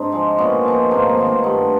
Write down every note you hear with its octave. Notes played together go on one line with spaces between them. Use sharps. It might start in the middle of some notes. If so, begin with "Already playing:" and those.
Already playing: G#2 C4 D4
F3 G#3
A#2 B3 C#4
F3 G#3
G#2 A#3 C4
A#3
D#3 G#3 B3
A#3
G2 A3 B3